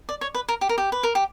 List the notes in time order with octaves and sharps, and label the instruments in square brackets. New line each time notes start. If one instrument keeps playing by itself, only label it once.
[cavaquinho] D5
C#5
B4
A#4
G4
A#4
G4
B4
A#4
G4